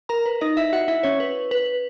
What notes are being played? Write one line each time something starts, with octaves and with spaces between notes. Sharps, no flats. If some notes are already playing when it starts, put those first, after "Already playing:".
A#4 A#5
B4
D#4 D#5
E4 E5
F#4 F#5
E4 E5
C#4 C#5
B4
B4